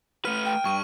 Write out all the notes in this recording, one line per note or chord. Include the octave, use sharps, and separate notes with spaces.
A3 B4 F6 D#7
G5
G2 C#6 D#7